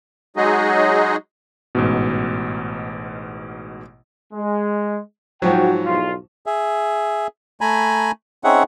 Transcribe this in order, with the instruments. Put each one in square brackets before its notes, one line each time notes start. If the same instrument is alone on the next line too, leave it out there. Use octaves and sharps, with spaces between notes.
[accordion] F#3 G#3 D#4 F#4 G#4 D#5
[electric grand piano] A1 G#2 B2
[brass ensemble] G#3
[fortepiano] G#2 F3 F#3 [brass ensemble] F#4 G5
[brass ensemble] B1 E2 F4
[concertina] G#4 E5
A3 G#5 A#5 B5
C4 C#4 D#4 G#4 E5 F#5